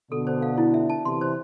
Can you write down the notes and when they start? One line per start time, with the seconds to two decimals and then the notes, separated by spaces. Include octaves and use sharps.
0.11 B2 D3 A4
0.27 C5
0.42 F5
0.58 E4
0.74 E5
0.90 A5
1.05 C3 E3 C6
1.21 C5